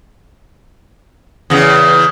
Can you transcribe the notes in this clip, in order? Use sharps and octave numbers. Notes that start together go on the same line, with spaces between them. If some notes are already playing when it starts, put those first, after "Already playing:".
E2 C#3